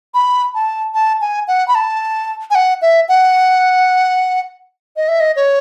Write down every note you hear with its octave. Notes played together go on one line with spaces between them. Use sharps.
B5
A5
A5
G#5
F#5
B5
A5
G#5
F#5
E5
F#5
D#5
E5
D#5
C#5